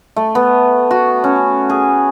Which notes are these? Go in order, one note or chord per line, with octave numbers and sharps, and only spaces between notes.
A3
B3
F#4
C#4
G#4